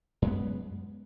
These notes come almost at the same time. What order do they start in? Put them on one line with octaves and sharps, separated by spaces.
F#2 G#3 B3